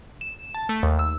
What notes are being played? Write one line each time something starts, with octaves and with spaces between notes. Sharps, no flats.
E7
A5
A3
D#2
E6